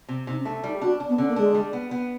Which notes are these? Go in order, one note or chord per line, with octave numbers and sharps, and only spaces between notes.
C3
C3 D#4
C#4
A3 D4
G3 D#4
G4
D4 F#4
D4
B3
D3 C#4
A#3
G#3 D4
G3
B3
B3